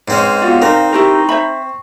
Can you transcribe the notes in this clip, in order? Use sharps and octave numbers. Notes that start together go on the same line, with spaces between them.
G#2 C4 C#4 B4 D#5
B3 F4 F#4 D5 F5
C4 D#4 A#4
E4 G4 A#4 C#6
C5 E5 B5